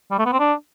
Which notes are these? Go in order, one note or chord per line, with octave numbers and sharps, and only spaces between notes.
G3
A3
B3
C4
D4